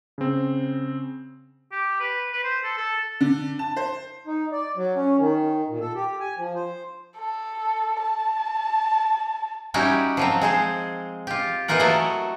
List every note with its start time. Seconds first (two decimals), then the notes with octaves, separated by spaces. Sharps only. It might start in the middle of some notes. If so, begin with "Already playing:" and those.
0.18 C#3 C4
1.72 G4
2.00 B4
2.33 B4
2.44 C5
2.64 A4
2.78 A4
3.21 D3
3.59 A5
3.77 C5
4.27 D#4
4.52 D5
4.77 F#3
4.96 C#4
5.19 D#3
5.69 A#2
5.81 A4
5.95 G4
6.20 G#5
6.38 F3
6.55 C5
7.17 A4
8.01 A5
9.74 G3 C#4 D#4 E4 F#4 G4
10.17 F3 F#3 C4
10.41 G#3 G#4 C5
11.27 F4 G4
11.68 E3 A#3 D#4 F4 A#4 F#5
11.80 F#3 A3 E4 F#4 A4 D#5